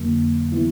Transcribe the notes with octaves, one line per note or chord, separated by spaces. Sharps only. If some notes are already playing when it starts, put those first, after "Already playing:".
Already playing: F2 D3 F#3 A#3
E3 G3 B3 E4